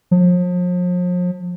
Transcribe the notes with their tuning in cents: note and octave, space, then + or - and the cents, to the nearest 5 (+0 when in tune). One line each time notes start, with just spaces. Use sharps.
F3 +40